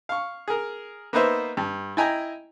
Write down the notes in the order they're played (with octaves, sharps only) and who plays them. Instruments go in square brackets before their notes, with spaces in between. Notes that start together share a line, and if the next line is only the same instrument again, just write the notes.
[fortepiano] F5 C#6
G#4 A#4
A#3 B3 D#4 B4 C5 E5
G2
E4 D#5 G5 G#5 A#5